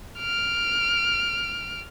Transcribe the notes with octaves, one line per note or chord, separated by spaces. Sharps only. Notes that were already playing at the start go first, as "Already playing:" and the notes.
F6 D7